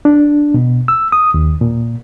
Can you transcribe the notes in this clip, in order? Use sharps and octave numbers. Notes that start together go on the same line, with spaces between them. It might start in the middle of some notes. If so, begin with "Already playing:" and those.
D4
B2
E6
D#6
D#2
A#2